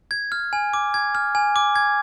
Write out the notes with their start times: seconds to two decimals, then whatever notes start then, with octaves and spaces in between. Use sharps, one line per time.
0.11 G#6
0.32 F6
0.53 G#5
0.74 D6
0.94 G#6
1.15 F6
1.35 G#5
1.56 D6
1.76 G#6